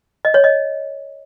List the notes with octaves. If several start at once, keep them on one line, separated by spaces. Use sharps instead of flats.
D#5
C#5
D#5